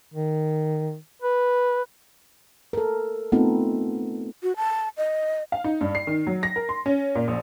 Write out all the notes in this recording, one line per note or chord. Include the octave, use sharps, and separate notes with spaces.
D#3
B4
A4 A#4
A3 B3 C4 D#4 F4 A4
F#4
A5
D#5
F5
D#4
G2
C7
D#3
F#3
A#6
A#4
C6
C#4
A#2
A#1